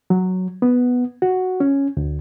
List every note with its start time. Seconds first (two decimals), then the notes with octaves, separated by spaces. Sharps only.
0.10 F#3
0.62 B3
1.22 F#4
1.60 C#4
1.97 D2